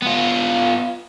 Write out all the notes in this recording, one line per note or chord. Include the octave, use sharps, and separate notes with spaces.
B3 F4